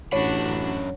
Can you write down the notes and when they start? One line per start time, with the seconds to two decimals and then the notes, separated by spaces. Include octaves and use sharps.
0.13 A1 F#2 D4 F#4 C#5 B5